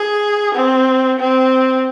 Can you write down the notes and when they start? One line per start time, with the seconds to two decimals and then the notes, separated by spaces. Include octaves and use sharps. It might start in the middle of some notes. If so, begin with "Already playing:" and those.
Already playing: G#4
0.54 C4
1.19 C4